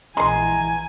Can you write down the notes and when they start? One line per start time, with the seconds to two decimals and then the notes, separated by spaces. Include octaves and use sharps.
0.17 A#1 E3 G#3 G#5 A#5 C6